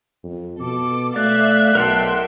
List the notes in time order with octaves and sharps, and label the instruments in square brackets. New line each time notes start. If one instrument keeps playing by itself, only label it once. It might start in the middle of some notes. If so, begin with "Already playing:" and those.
[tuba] F2
[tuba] B2 [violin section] A4 [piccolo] D6
[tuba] A3 [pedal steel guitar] D5 [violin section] E5 F5 [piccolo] F#6
[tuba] B1 [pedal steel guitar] A#4 F#5 A5 [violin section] E5 G5 C6